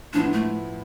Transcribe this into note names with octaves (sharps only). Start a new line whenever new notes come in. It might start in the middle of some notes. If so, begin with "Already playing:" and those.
A2 F3 B3 D4 E4
A3